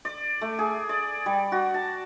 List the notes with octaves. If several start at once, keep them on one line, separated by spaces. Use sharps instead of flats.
D5
A3
G#4
D5
G3
F#4
A5